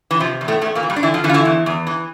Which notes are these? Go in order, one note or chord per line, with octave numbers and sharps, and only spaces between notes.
E3
C3 F3
E2
A2 A3
E2 A2 A3
A#2 A#3
E3
G2 G3
D4
D3 E3 E4
F3 F4
D3 E3 E4
F4
E3 E4
E2
E2
E3